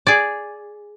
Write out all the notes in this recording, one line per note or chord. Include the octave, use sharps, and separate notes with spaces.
G#4 D5